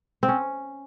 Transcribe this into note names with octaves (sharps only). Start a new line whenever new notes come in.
C4
C#4